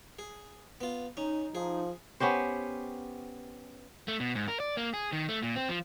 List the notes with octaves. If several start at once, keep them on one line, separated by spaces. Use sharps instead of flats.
G#4
B3 F4
C#4 D#4
F3 G#4
B3 C#4 G4 C5
A3
B2
G#2
A#4
D5
A#3
G#4
D#3
A3
A#2
C4
F3